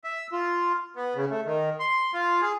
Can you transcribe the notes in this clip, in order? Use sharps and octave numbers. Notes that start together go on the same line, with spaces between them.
E5
F4
B3
C#3
A3
D#3
C6
F4
G#4